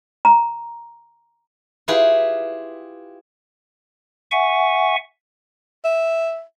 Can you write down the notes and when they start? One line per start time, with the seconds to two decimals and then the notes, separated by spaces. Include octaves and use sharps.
0.25 A#5
1.88 E4 F4 G4 G#4 B4
4.31 E5 F#5 G#5 C#6
5.85 E5